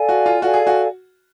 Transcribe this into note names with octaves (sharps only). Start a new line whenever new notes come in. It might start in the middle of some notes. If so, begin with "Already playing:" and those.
Already playing: A4 D5 F5 G#5
F#4
F4
F#4 A4 D5 F5 G#5
G#4
F#4